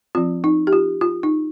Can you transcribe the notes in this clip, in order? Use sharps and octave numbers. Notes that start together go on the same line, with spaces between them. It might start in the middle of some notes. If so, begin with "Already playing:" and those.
F3 C4 F4
D#4
G4
F4
F4
D#4